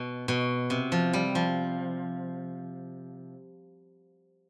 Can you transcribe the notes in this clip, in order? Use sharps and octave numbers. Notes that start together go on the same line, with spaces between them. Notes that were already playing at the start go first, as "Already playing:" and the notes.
Already playing: B2
B2
C3
F3
G3
F3